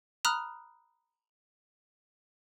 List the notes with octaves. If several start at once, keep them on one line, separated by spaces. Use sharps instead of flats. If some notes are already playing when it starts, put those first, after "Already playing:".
A#5 B5 D#6 F6 F#6